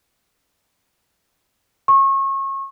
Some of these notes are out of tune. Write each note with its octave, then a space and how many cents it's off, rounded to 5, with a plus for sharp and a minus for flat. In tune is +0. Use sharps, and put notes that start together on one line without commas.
C#6 -30